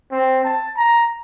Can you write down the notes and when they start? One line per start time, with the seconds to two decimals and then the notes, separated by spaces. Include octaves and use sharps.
0.11 C4
0.44 A5
0.76 A#5